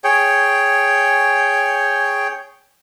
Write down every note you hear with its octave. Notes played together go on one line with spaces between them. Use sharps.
G#4 C#5 G5